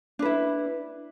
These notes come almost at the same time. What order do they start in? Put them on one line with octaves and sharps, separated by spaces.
D4 B4 E4